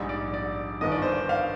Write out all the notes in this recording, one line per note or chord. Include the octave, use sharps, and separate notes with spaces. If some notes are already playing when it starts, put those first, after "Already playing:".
Already playing: A#1 G#2 G3
D5
D5
G1 G2 D#3 D#5
D5
C5
D5
F5